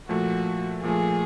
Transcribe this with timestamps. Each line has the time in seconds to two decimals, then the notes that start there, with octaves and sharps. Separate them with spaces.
0.09 A#2 F3 A3 F#4
0.83 A#2 F3 A3 G#4